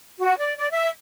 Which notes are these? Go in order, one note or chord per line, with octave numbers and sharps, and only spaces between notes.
F#4
D5
D5
E5